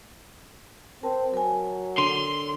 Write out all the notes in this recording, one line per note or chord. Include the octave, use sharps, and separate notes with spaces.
C4 A#4 A5
F#3 A#4 G#5
D3 C6